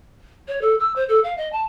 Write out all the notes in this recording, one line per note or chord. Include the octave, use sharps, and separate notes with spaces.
C#5
A4
E6
C5
A4
F5
D#5
A5